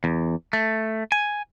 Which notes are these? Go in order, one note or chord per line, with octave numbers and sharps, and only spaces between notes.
E2
A3
G#5